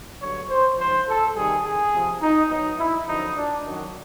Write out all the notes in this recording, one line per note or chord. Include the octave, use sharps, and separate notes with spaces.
G2 D3 F#3 C#5
C5
G#2 F3 C5
A4
C3 D#3 G3 G#4
G#4
C3 F3
D#4
B2 F#3 D#4
E4
F#2 D3 F3 D#4
D4
F#2 D#3 F#3